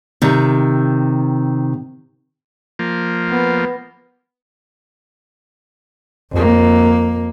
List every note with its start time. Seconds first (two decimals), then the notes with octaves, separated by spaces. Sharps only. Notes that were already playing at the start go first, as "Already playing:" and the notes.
0.22 C3 D#3
2.79 F3 A#3
3.30 B3
6.32 F2 A#3